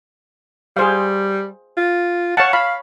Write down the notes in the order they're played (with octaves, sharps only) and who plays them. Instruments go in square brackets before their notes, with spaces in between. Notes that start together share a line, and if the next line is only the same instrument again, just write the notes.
[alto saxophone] G3 [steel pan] G#4 C5 F5
[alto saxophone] F4
[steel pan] C#5 F5 A5 [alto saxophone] F#5
[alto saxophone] F5 [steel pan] B5